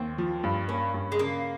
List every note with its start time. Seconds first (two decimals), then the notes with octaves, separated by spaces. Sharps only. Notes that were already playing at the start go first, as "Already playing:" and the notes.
Already playing: D#2 C4
0.18 F3
0.44 G2
0.68 A#3 C#4
0.94 G2
1.12 G#3
1.19 C#3 A#3